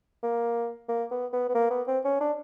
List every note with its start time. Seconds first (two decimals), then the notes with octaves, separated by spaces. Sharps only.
0.23 A#3
0.89 A#3
1.11 B3
1.33 B3
1.48 B3
1.55 A#3
1.70 B3
1.87 C4
2.04 C#4
2.21 D4